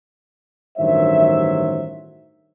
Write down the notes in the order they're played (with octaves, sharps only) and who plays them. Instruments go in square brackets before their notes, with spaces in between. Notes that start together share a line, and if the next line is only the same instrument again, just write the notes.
[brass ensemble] A1 G2 D#3 F#3 C5 E5